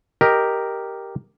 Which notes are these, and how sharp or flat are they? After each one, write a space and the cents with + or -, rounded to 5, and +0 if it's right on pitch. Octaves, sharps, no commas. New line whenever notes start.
G4 +0 A#4 +0 D#5 +0